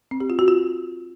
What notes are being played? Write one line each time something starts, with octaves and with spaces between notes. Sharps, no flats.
C4
G4
F4
F#4
F4